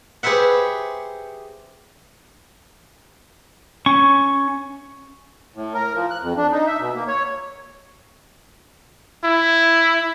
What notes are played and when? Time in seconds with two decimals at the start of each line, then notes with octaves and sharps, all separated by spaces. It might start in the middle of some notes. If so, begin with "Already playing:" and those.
0.23 G4 G#4 B4 C5 E5 F#5
3.86 C#4 C#6
5.56 A2
5.74 A#4
5.95 F3
6.10 F#6
6.22 F2
6.37 D4
6.52 D#4
6.67 E5
6.80 B2
6.95 A#3
7.08 C#5
9.24 E4